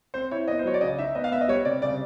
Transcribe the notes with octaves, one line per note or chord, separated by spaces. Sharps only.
C4 C5
E4 C#5
B3 D#5
C5
F#3 C#5
D5
C#3 D#5
D#4 E5
B3 D#5
F5
B3 E5
D#5
G3 C#5
C3 D5
C#3 D5